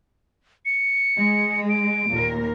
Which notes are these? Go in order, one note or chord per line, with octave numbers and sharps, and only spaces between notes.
C#7
G#3
D7
D#2 A#2 A#4